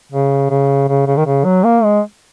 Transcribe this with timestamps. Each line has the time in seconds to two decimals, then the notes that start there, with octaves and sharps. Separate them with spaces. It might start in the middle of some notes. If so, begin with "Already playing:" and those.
0.12 C#3
0.50 C#3
0.88 C#3
1.07 C#3
1.17 D#3
1.26 C#3
1.45 F#3
1.64 A#3
1.83 G#3